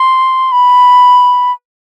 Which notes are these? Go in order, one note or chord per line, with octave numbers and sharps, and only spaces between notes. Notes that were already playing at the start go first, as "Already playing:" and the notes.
Already playing: C6
B5